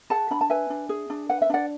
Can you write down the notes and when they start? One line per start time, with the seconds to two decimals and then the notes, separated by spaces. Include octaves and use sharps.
0.10 G#4 F#5 A5
0.31 D4 B5
0.41 A5
0.50 B4 E5 G#5
0.70 D4
0.89 G#4
1.10 D4
1.29 B4 F#5
1.42 E5
1.50 D4 D5 F#5